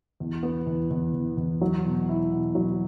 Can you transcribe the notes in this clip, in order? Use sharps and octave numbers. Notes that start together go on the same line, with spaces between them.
E2
B3
E2
E2
E2
E2
F#3
B2
E4
B2
F#3